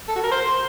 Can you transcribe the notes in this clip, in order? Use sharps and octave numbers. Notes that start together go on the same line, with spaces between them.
A4
F#4
A#4
C5